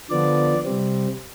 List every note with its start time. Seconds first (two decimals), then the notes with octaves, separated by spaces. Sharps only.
0.10 D3 F3 B3 D5
0.64 C3 G3 C4